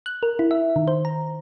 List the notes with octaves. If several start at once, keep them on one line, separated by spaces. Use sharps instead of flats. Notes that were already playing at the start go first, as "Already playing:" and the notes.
F#6
A#4
E4
E5
D#3
C5
A#5